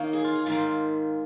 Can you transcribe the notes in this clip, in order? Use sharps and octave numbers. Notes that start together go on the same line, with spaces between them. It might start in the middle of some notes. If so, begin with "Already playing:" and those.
Already playing: D#3 A#3 D#4 C#5 D#5 F5
G#4
F4
G#4
G#2 D#3 A#3 F4